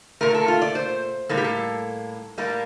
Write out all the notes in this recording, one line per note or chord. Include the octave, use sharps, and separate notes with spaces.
A#2 A3 A#4
A4
F4
D5
C5
A2 G3 A#3 A4
G4
A4
A2 G3 A#3